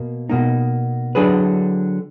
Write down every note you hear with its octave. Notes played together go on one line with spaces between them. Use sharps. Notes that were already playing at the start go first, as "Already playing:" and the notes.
Already playing: B2 A#3
B2 A#3 D#4
D3 F#3 D4 G#4 B4